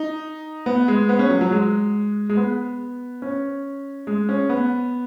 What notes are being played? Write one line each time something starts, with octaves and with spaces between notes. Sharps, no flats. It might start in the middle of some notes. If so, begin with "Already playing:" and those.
Already playing: D#4
B3
G#3
B3
C#4
F#3
F#3
G#3
G#3
B3
C#4
G#3
C#4
B3